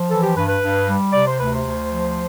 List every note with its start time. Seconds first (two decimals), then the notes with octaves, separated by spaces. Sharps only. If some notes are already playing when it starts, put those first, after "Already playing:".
Already playing: F3
0.10 E3 A4
0.23 G4
0.36 G2 B4
0.48 B4
0.62 G2
0.88 G3
1.13 C3 D5
1.26 C5
1.39 D2 B4
1.53 C5
1.65 D2
1.91 F3